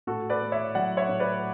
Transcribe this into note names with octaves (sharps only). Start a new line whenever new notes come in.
A2 F#4 A4
B4 D5
A3
C#5 E5
F#3 D5 F#5
C#5 E5
A2
B4 D5